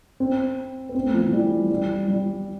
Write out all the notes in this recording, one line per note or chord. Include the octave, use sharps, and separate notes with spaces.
C4
B3
C4
A3
F3
E3
G3
G3
G3